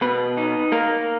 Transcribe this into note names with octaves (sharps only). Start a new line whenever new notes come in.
B2 B4
D#4
A#3 A#4